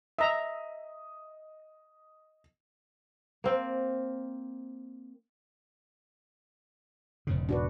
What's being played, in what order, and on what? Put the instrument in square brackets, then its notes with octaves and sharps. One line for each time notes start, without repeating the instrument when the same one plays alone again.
[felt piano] D#5 D#6 [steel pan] E5 A#5
[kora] A#3 C4
[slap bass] E1 G#2 C#3
[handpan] D4 F#4 B4